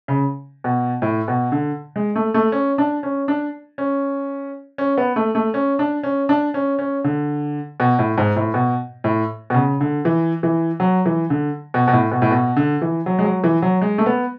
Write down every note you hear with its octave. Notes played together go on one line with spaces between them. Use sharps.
C#3
B2
A2
B2
D3
G#3
A3
A3
C#4
D4
C#4
D4
C#4
C#4
B3
A3
A3
C#4
D4
C#4
D4
C#4
C#4
D3
B2
A2
G#2
A2
B2
A2
B2
C#3
D3
E3
E3
F#3
E3
D3
B2
B2
A2
B2
A2
B2
D3
E3
F#3
G#3
F#3
E3
F#3
G#3
A3
B3